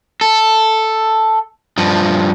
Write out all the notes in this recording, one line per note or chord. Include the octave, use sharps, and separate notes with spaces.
A4
G2 F3